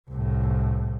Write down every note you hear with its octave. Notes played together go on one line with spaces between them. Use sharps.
C2 A2